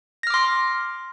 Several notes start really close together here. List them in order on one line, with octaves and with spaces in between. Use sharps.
A#6 F6 D6 C6